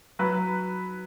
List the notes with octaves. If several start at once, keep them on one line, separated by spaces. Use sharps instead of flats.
F#3 B4